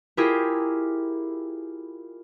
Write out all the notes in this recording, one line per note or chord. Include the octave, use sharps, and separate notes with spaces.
E4 F4 G4 G#4 A#4